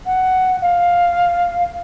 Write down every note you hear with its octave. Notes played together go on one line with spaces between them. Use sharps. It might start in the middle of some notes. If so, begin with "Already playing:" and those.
F#5
F5